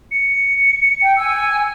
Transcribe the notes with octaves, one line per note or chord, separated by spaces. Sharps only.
C#7
G5
G#5 E6